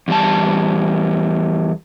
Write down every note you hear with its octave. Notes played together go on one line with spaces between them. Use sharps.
E2 G3 A5